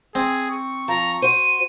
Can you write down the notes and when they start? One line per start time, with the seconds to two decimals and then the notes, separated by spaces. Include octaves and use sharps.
0.15 C4 G#4
0.51 C#6
0.88 F3 A#5
1.22 F#4 C5 D#7